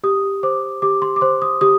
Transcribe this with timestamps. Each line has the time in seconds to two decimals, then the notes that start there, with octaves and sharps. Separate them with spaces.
0.03 G4 D#6
0.43 C5 D6
0.82 G4 D6
1.02 C6
1.16 D6
1.21 C5 C6
1.42 D#6
1.61 G4 D#6